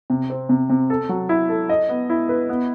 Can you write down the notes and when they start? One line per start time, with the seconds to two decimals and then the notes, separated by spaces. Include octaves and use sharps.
0.10 C3
0.30 C4
0.49 C3
0.70 C3
0.90 A4
1.09 F#3
1.29 E4
1.49 A4
1.69 D#5
1.89 B3
2.10 E4
2.29 B4
2.49 B3